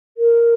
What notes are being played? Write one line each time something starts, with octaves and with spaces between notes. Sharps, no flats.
A#4